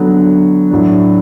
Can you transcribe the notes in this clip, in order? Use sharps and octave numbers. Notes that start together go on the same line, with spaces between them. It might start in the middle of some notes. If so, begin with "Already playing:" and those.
Already playing: D3 F#3 B3
A2 F#3 D4